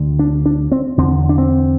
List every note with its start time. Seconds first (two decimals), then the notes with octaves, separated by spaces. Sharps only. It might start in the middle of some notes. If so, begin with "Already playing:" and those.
Already playing: D2 D3
0.19 D4
0.46 D4
0.72 C4
0.98 E2 D3 C4
1.29 D4
1.38 C4